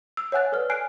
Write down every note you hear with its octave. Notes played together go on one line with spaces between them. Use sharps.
E6
C#5 E5 F#5 G#5 F#6 A6
A4 B4 D5 F6
G#5 F6 F#6 C7 D7